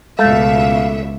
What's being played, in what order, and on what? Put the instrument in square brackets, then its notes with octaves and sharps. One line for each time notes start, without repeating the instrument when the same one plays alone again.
[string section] C#2 B2 E5 [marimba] G#3 [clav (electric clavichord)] A3 [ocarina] F5